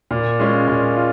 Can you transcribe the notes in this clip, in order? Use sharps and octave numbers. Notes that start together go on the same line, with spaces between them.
A#2
G#3 C#4 F4
A#2
F4